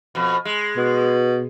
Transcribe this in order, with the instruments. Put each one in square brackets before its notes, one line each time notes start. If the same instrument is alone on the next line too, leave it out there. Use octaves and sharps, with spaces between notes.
[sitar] F2 B2
G#3
[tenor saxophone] B2